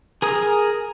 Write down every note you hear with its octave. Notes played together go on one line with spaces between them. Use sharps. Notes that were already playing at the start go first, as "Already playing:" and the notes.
G#4 A#4 D#6